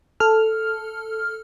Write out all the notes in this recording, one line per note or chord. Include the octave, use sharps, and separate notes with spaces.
A4 F6